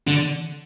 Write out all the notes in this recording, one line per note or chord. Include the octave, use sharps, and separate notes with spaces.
D3